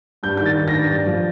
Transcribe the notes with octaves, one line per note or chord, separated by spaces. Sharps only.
G2 G6
D#3 G6
A6
D#3
A#6
G2
G2 A6
F3